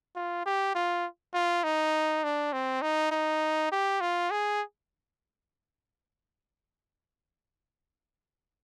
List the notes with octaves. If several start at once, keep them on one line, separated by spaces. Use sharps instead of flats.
F4
G4
F4
F4
D#4
D4
C4
D#4
D#4
G4
F4
G#4